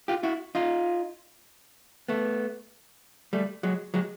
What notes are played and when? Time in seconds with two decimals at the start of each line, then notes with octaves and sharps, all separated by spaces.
0.08 F4 G4
0.23 E4 F#4
0.55 D#4 F4
2.09 A3 B3
3.33 G3 A3
3.63 F#3 G#3
3.94 F#3 G#3